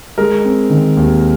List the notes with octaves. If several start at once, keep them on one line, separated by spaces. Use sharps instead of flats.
G#3 A#4
C4
D#3
D#2